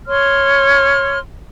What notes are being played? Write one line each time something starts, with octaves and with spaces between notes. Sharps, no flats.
C#5 C6 F6